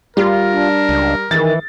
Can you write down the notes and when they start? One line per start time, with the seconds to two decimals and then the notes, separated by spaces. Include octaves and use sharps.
0.17 G3 F4 A#4
0.52 D4
0.89 C#2
1.31 D#3 E3 A6